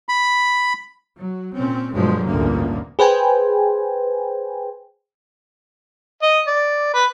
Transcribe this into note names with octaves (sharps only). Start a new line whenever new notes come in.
B5
F#3
A#2 C4 C#4
G2 B2 D3 F3 F#3 G#3
A1 D2 G2 A#2 A#3
G#4 B4 C5 G5 G#5
D#5
D5
B4